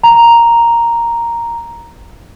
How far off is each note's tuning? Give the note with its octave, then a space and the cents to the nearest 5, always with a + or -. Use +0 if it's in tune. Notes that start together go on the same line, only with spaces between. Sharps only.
A#5 +0